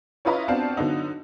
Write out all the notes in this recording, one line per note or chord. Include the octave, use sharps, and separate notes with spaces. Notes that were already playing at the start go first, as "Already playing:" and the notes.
C#4 E4 F4 B4 D#5 A#5
B3 C4 D4 F#4 F5 A5
D3 F#3 B3 D#4